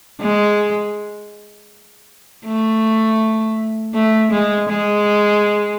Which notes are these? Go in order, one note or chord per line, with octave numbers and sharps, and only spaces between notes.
G#3
A3
A3
G#3
G#3